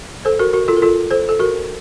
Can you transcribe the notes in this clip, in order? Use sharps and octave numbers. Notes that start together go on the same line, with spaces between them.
A4 C5
F#4 A#4
F#4 A#4
F4 A4
A#4
F4 A4
A4 C5
A4
F#4 A#4